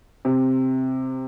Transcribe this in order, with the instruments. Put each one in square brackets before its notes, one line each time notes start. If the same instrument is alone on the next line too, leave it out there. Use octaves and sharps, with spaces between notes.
[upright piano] C3